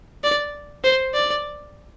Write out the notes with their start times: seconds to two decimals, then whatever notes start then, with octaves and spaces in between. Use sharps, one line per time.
0.24 D5
0.84 C5
1.14 D5